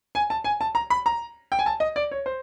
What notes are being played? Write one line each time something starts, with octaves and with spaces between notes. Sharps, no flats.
G#5
A5
G#5
A5
A#5
B5
A#5
G5
G#5
A5
D#5
D5
C#5
C5